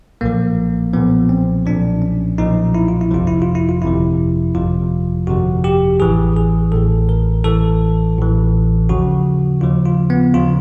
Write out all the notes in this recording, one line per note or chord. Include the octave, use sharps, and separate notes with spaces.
B1 A#2 F3 A#3
B1 A#2 F3 B3
C4
B1 A#2 F3 D4
C#4
B1 A#2 F3 D#4
E4
F4
E4
G1 F2 C3 F3 F4
E4
F4
E4
F4
G1 F2 C3 F3 E4
G1 F2 C3 F3 F4
G1 F2 C3 F3 F#4
G4
A1 A2 E3 G#4
G#4
A1 A2 E3 A4
A#4
A1 A2 E3 A4
A1 A2 E3
D#2 C#3 F3 F#4
D#2 C#3 F3 F4
F4
B3
D#2 C#3 F3 F4